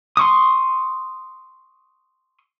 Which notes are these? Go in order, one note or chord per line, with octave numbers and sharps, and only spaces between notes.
C6 C#6 D#6